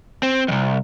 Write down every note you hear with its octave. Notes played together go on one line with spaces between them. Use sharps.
C4
C2 F2